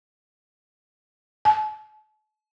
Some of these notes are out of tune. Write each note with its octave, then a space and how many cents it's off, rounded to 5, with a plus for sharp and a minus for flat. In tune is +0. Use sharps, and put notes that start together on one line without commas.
A5 -40